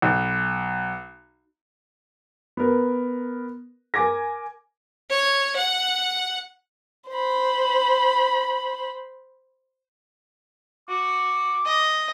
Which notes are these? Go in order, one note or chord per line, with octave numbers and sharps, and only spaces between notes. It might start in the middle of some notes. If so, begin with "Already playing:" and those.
B1
B3 A#4
A#4 G#5 D6 G#6 A#6
C#5
F#5
C5 B5
F#4 D6
D#5